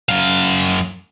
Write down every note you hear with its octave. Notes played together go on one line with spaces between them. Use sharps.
F#2 F5